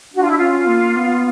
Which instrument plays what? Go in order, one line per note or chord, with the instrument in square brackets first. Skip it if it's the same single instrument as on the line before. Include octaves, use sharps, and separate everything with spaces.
[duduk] D4 [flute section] F#4
[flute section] F4
E4
F4
[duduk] C#4
A#3
B3